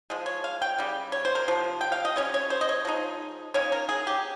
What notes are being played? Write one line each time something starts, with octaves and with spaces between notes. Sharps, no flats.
F3 G#3
C#5
F5
G5
C#3 G3
C#5
C5
A#4
C3 F3
G5
F5
D#5
G3 C#4 C#5
C#5
C5
D#5
C#5
F3 G#3 D#4
D#3 A#3 C#4 C#5
A#4
G#4
G4